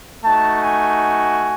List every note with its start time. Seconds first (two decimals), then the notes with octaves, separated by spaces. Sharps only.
0.24 A3 D#4 F#4 A5
0.61 G#5